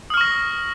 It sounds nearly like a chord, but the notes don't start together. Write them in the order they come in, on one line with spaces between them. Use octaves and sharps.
D#6 F6 C#6 A#6